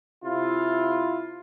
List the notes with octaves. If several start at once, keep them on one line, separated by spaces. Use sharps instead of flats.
C3 E4 F4